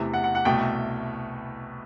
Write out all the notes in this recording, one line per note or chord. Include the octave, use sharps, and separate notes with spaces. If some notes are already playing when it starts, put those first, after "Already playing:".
Already playing: E2 C3 E3 A3
F#5
F#5
F#5
C2 B2 A3 G5